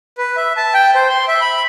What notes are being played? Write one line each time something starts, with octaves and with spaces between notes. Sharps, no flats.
B4
E5
A5
G5
C5
C6
E5
B5